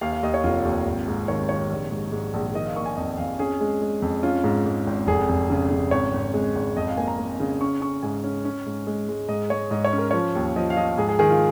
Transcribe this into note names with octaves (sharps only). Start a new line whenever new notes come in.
D#2 F5
F5
D#2 D#5
C#5
F1 F4
D#2
G#1
G#2
D#3 C#5
D#3 C#5
A#1
G#2
G#2
A#1
D#3 D#5
F5
A#3 C#6
G#5
F2 D#5
F2 F5
C#4 G#4
G#3
G#3
F2
C#4 F4
G#2
G#2
G#1
F1 G#4
F1
C#3
C#3
G#1 C#5
G#1
G#3
G#1
F2 D#5
F5
A#3 G#5
A#5
A#3
C#3
C#4 C#6
C#4 C#6
G#2 G#5
C#4
C#4
G#2
G#3
G#3
G#2 D#5
G#3 C#5
G#2 D#5
C#5
C#4
A#4
F3 C#5
D#2
F3 D#5
F5
F3 D#5
G#2 G#4
G#4
D#3 G#4
F4